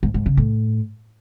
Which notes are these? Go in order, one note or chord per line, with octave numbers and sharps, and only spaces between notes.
G#2
G#2
C#3
A2